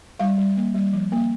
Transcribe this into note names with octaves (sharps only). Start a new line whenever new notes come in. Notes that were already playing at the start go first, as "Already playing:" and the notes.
G3 F5
G3
A#3
G3
F3
A#3